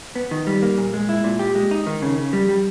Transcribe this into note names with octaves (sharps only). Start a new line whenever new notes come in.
B3
D#3
G3
A#3
A#2
G#3
E4
A#2
G4
G#3
D#4
D#3
C#3
C#3
G3
G3